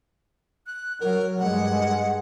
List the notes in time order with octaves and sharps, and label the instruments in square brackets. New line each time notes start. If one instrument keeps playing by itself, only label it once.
[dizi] F#6
[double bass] F#3 [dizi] A#4
[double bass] G2 G#3 [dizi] F#5